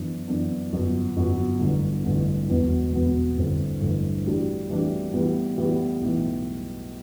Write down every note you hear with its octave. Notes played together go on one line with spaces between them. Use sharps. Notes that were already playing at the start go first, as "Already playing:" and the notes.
Already playing: F#2 E3 B3 D4
F#2 E3 B3 D4
G1 F#2 F#3 B3 F#4
G1 F#2 F#3 B3 F#4
A1 G2 D3
A1 G2 D3
E1 E2 B2 F#3 B3
E1 E2 B2 F#3 B3
A1 G2 D3 A3 C4
A1 G2 D3 A3 C4
A2 E3 G3 D4 F#4
A2 E3 G3 D4 F#4
A2 E3 G3 B3
A2 E3 G3 B3
B1 A2 E3